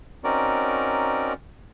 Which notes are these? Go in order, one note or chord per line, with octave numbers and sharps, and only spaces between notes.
C4 C#4 D#4 F#4 A#4 D5